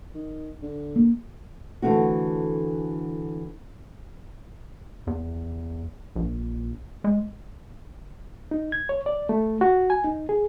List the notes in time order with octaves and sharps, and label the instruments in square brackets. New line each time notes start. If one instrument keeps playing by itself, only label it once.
[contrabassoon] D#3
D3
[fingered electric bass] A#3
[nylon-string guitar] D3 E3 A3 C4 F#4
[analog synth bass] E2
A#1
G#3
[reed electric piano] D#4
G#6
C#5
D5
A3
F#4
G#5
D#4
G#4